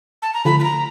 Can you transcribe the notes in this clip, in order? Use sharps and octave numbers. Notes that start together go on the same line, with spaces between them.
A5
A#5
D3 F3 A3 B5
B5
A#5